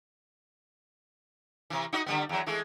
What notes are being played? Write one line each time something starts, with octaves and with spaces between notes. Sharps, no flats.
C3 E3
D#4 F#4 D#5
D3 G3 B3
E2 F#3
E3 G#3 A3